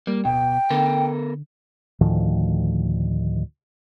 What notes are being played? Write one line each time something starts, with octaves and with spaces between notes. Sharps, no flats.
G3 A#3
D1 B2 G5
D3 B3 A4 A#4
D2 A2 D#3 F3